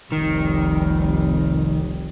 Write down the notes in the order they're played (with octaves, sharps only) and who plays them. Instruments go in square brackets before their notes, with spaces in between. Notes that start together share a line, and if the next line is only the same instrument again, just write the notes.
[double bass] F1 C2 [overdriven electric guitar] D#3